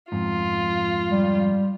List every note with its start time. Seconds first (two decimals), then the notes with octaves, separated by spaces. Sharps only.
0.12 F2 G#2 F4
1.11 G3